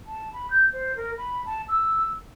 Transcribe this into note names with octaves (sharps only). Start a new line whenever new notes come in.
A5
B5
G6
C5
A#4
B5
A5
E6